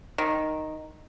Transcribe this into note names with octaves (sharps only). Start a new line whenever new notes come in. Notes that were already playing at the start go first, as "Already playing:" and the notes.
D#3